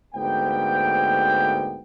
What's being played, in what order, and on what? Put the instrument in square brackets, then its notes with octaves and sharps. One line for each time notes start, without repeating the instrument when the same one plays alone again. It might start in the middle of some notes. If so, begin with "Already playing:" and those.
[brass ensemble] D2 G#2 A#3 B3 G5